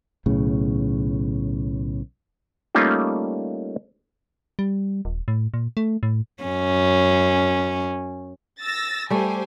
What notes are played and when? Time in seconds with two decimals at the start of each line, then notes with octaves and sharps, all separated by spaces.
0.26 B1 A2 C#3
2.75 G3 A3 A#3 C#4 D#4 F4
4.59 G3
5.05 D#1
5.28 A2
5.54 A#2
5.77 A3
6.03 A2
6.44 F#2 C#4
8.61 E6 A6 A#6
9.10 G3 A3 G4 C5 G#5